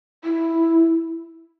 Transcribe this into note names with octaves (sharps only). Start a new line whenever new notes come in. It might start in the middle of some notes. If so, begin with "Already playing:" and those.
E4